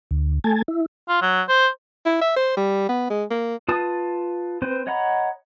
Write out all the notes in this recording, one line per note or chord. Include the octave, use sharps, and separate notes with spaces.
D2
A3 G#5 A5
E4
F4
F#3
C5
E4
E5
C5
G3
B3
G#3
A#3
F4 B4 A5 D#6
C4 B4 C5
C#5 D#5 F#5 A#5 B5